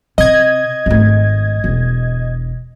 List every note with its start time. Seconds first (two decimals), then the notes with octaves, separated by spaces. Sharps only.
0.18 C3 D#5 G#6
0.86 G#1 A3
1.64 E1